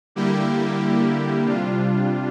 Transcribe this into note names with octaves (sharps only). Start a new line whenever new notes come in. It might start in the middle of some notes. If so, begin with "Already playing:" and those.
D3 G3 A#3 E4 G4
C3 G3 D4 F4